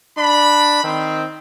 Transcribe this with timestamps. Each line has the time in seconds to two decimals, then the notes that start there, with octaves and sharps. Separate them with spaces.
0.17 D4 B5
0.84 D#3 C4